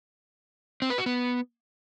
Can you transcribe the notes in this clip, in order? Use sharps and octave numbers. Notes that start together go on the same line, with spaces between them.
C4
B4
F#4
B3